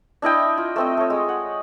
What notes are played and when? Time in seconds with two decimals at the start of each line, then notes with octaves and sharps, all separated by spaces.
0.22 D4 E4 D#5 G5
0.57 F4
0.76 A3 C4 D#5
0.97 A3 C#5
1.10 G#3
1.29 F#5